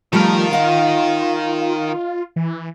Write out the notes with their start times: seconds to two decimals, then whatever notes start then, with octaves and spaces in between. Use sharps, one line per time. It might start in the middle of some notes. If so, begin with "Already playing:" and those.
0.13 D#3 F3 G3 A3 F4 A#4
0.51 D#5 F5 F#5
2.36 E3